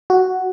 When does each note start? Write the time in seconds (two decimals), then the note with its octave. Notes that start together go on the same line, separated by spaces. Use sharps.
0.10 F#4